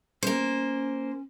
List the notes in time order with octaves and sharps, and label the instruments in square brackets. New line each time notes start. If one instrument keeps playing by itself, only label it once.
[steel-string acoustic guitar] A#3 C5 [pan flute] C#4